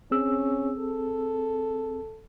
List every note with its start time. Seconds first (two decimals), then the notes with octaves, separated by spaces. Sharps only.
0.11 C4 C#4 G#4 E6
0.78 A4